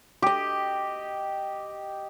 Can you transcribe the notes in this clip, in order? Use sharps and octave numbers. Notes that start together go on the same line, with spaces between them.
G4 D#5